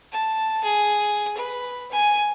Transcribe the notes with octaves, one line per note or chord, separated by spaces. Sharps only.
A5
G#4
B4
G#5